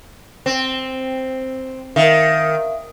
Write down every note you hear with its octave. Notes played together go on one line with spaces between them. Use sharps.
C4
D#3 A#4 E5 F5